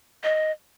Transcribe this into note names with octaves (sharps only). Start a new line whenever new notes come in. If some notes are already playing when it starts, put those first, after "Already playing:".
D#5